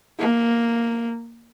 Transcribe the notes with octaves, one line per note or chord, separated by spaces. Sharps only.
A#3